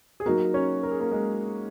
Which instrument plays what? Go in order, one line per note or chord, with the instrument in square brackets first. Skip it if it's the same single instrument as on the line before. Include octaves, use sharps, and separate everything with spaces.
[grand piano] G#4
[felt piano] F#3 D#4 F#4 [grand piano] A#3 A#4
[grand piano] C#4 C#5
A#4
G#4
A#3 A#4
G#3 G#4